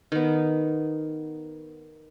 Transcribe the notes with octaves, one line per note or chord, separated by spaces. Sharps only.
D#3 B3